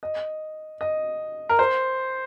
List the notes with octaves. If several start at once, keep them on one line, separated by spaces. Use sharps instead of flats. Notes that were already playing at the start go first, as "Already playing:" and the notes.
D#5
D#5
A#4
C5